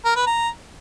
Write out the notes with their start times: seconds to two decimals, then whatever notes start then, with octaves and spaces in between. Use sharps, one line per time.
0.05 A#4
0.16 B4
0.27 A#5